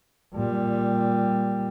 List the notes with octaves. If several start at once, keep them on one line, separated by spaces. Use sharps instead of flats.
A#2 G3